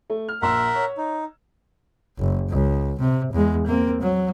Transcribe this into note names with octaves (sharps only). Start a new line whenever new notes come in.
A3
F6
A#1 A#4 E5 F#5 C6 E6
C#5
D#4
F#1
C#2
C3
E2 G#3
A#3 C4
F#3